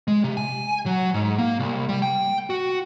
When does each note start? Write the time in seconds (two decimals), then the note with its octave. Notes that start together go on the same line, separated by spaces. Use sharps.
0.08 G#3
0.24 C3
0.37 G#5
0.86 F#3
1.14 G#2
1.39 A#3
1.60 C2
1.89 G3
2.02 G5
2.50 F#4